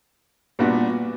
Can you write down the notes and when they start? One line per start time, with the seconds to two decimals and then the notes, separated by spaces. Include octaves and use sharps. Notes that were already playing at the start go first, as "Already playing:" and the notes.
0.59 A#2 G3 B3 D4 F#4